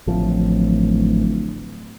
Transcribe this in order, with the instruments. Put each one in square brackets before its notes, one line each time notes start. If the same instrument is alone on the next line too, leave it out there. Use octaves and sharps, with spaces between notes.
[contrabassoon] D1 [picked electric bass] A1 F3